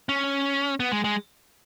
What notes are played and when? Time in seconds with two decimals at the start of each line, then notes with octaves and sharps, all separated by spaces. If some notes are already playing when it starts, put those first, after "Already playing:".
0.09 C#4
0.80 B3
0.91 G#3
1.04 G#3